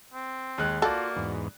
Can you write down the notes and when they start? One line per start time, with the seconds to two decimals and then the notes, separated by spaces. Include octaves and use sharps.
0.14 C4
0.58 D#2 G#3 F#6
0.82 A#3 F4 F#4 A4 D5
1.16 E2 G#2